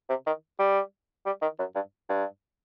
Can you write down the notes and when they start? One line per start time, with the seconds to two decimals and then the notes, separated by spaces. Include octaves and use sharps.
0.09 C3
0.27 D#3
0.59 G3
1.26 G3
1.42 D#3
1.59 F#2
1.75 G2
2.09 G2